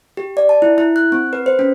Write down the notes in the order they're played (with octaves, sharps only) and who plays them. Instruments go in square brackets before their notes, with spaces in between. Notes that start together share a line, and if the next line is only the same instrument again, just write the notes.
[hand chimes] G4
D5
A5
E4
E4
F#6
C4
B4
C5
C#4